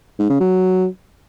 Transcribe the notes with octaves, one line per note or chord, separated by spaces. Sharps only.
G#2
C#3
F#3